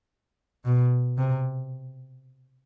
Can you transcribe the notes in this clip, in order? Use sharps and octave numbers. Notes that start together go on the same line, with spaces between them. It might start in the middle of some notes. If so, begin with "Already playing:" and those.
B2
C3